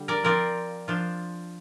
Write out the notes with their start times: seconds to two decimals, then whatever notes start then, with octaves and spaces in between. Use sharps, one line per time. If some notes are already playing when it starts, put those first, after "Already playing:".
Already playing: D3 G3
0.08 A#4 D5
0.23 F3 C4 F4 A#4 D5
0.88 F3 D4 F4